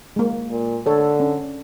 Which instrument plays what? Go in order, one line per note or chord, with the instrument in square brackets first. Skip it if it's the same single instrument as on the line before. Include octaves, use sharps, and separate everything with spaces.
[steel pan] G#3 A#3
[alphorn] A#2
[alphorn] D3 [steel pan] A4 C#5
[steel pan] C#4